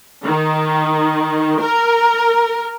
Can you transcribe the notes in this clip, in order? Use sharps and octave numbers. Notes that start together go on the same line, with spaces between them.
D#3
A#4